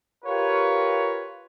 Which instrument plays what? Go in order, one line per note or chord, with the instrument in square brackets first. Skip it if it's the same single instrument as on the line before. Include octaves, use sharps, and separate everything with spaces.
[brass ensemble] F4 G4 A#4 B4 C#5